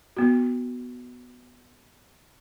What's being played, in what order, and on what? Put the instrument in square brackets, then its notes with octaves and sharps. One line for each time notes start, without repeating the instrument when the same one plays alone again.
[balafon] B3 F#4